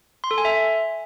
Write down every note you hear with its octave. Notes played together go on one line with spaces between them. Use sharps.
C6
A4
G#5
E5